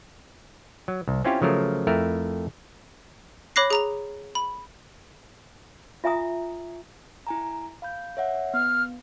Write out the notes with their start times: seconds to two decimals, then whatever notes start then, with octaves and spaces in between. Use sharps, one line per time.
0.88 F#3
1.08 C2
1.25 C4 C#4 E4 F4 G4 C#5
1.42 C#3 F3 F#3 A3 A#4
1.87 F2 A3 E4 A#4
3.56 C#5 B5 D6 F#6 A#6 C7
3.70 G#4 A#5 F7
4.35 B5
6.04 F4 E5 G#5 A#5 D#6
7.27 E4 G#5 A#5
7.82 F5 B5 G6
8.17 C#5 E5 F#5
8.54 B3 F6